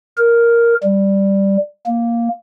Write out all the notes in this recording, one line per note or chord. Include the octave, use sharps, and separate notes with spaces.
A#4
G3
A#3